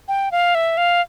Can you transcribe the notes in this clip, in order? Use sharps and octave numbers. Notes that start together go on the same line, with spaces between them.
G5
F5
E5
F5